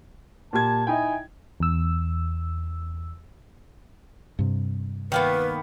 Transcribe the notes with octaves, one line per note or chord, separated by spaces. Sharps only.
A#2 G4 A5 G#6
D#4 E4 G5 G#5
E2 E6
G2 C3
D#3 A#3 B3 B4